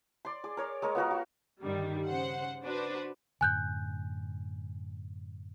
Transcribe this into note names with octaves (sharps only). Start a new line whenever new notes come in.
D5 C6
G#4 D5
A#4 C#5 D5
G#3 A#4 C#5 A#5
B3 F4 F#4 A#4
F#4
G2 D3 D#3 G3
C#3 C5 F#5
D4 F#4 B4 C5
F#2 A2 D3 G#5 F#6 G6